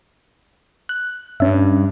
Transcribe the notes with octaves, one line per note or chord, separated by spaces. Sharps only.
F#6
G2 C#4 E5